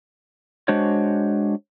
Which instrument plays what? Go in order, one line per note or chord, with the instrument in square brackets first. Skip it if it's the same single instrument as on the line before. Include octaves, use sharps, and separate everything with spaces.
[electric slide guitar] G#3 D4 F#4 C5 C#5